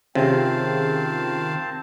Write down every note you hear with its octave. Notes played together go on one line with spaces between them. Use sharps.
C3 D#3 C4 C#4 F4 G#4 F5 A5